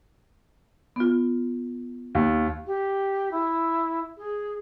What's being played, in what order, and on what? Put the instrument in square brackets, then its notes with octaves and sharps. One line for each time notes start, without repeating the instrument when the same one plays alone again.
[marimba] B3 F4
[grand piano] D#2
[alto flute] G4
E4
G#4